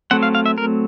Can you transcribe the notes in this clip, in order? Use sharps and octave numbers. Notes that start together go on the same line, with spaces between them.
F#3 A3 C4 F#5
F5
F5
E5
A#4